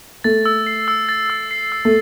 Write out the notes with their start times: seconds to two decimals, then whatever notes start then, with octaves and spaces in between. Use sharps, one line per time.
0.24 A3 A6
0.46 E6
0.67 C7
0.88 E6
1.09 A6
1.30 E6
1.51 C7
1.72 E6
1.85 A3